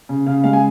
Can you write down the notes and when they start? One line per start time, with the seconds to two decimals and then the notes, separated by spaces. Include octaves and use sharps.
0.09 C#3
0.26 C#3 F5
0.44 G#3 F5
0.53 G#5